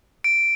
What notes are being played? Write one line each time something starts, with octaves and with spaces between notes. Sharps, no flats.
D7